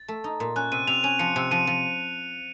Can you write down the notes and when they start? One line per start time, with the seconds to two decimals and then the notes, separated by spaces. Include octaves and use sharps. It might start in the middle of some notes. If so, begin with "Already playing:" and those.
Already playing: A6
0.08 A3
0.24 D#4
0.40 A#2
0.56 C#4 F#6
0.72 C3 D#7
0.87 C3 F7
1.03 C#4 D#7
1.19 F3 C#7
1.36 C3
1.51 F3 D#7
1.67 F3